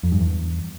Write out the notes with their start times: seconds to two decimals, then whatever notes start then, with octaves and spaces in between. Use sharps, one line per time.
0.03 F2
0.12 G2
0.21 E2